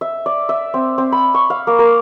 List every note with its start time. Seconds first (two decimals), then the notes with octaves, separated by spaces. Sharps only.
0.01 E5
0.26 D5
0.49 E5
0.74 C4
0.98 C4
1.12 B5
1.34 C#6
1.50 F5
1.67 A#3
1.79 A#4